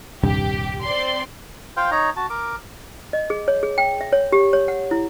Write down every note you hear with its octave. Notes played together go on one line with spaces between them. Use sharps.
D#1 C2 G2 G4
C4 D5 C6
F4 C5 F5 G5
D#4 C#5 A#5
F#4 A5
A#4 D6
D#5
G#4
C#5
G#4
G5
E5
C#5
G4
C#5
F#5
E4